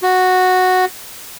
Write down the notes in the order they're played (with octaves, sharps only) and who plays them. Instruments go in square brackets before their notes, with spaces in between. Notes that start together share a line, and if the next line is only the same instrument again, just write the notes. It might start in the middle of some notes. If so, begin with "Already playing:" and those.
[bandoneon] F#4